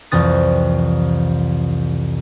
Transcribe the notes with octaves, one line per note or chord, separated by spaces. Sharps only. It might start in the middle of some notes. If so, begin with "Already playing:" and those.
C2 F2 E3 D#6 A6